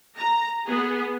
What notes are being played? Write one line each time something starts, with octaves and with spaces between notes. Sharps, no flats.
A#5
B3 G#4